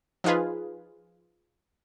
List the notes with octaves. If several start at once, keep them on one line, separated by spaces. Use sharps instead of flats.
F3 D#4 F4 G#4 B4